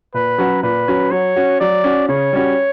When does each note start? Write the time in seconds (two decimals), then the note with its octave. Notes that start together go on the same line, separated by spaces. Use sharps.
0.14 A#2 B4
0.38 F#3 C#4 F#4
0.63 A#2 B4
0.88 F#3 C#4 F#4
1.11 F#3 C#5
1.36 C#4 F#4
1.60 F#3 D5
1.84 C#4 F#4
2.08 C#3 C#5
2.33 G3 C#4 F#4